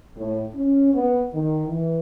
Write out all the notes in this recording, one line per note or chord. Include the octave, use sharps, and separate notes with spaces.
A2
C#4
B3
D#3
E3